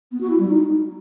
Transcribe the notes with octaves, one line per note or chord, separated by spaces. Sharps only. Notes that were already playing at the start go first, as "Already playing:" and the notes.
B3
F#4
E4
G3
D#4